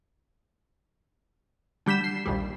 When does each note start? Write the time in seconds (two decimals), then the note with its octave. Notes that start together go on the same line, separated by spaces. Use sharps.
1.86 D3 G3 G6 B6 E7
2.04 C7
2.26 A#1 D#2 G3